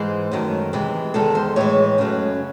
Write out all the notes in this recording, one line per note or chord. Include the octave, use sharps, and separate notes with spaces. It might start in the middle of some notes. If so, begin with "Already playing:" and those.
Already playing: G#2 E3 G#3 C5
F#2 D#3 A3
C3 E3 G#3
E2 D#3 G#3 A4
C5
A2 E3 G#3 C#5
F#2 C#3 F#3 A3